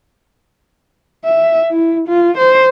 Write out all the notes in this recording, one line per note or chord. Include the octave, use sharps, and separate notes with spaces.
E5
E4
F4
C5